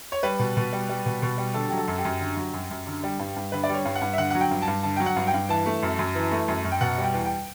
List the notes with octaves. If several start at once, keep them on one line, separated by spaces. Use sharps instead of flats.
C#5
G3 B4
B2
B2
G3
G3
B2
B2
G3
D3 A4
G4
F#3
A4
F#2
G4
F#2
D3
F#3
F#2
F#2
D3
G3
G2
G2
D3 B4
D5
G3
C#5
G2
F#5
G2
E5
D3 F#5
F#3 F#5
G5
G2
A5
G2
D3 A5
F#3 G5
F#5
G2
G5
G2
E3 A5
A3
F#2
F#2
E3
A3
F#2
F#2
G5
B2 F#5
G3
G5
E2
G5